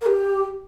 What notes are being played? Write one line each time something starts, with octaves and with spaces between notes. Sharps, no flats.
A#4
G4